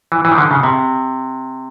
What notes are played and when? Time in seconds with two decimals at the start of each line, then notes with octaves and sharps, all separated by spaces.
0.12 E3
0.25 E3
0.32 D#3
0.38 D3
0.51 C#3
0.63 C3